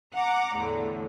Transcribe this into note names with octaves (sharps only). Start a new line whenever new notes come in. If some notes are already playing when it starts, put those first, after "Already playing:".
F#5 A#5 D6
E2 A2 D3